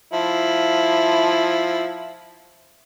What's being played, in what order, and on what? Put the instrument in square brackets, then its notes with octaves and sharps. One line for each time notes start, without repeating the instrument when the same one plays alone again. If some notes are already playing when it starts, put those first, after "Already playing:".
[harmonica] F3 E4